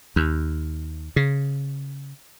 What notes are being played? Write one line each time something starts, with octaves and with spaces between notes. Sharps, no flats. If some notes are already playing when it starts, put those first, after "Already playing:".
D#2
C#3